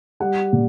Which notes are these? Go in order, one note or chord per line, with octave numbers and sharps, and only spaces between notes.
G3 F#5
A#2